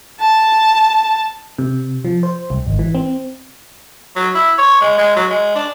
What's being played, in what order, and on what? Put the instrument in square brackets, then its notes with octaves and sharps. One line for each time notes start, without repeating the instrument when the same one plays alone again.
[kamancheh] A5
[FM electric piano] C3
F3
C5
C2
G#1
E3
C4
[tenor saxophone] F#3
E4
C#5
G#3
G#3
F#3
G#3
D4